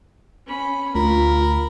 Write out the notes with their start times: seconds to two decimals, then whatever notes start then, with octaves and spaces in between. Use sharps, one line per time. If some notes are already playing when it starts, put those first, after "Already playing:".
0.47 C#4 B5
0.95 D2 F4 A#4 B5